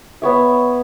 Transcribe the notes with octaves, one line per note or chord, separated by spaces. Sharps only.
B3 C#5 E5